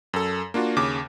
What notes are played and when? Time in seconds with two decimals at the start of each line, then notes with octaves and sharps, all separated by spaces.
0.14 F#2 A4
0.54 A#3 D4 F4 F#4
0.76 D#2 C#3 D6